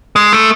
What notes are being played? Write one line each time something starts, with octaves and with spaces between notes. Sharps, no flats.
G#3
A3